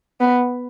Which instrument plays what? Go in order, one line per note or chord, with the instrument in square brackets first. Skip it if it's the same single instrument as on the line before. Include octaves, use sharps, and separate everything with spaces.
[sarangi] B3